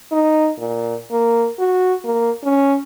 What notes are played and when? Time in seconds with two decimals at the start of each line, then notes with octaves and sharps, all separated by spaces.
0.11 D#4
0.59 A#2
1.11 A#3
1.59 F#4
2.05 A#3
2.44 C#4